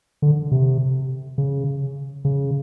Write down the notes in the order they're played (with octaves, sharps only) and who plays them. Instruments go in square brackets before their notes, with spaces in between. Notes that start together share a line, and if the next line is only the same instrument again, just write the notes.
[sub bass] D3
C3
C#3
C#3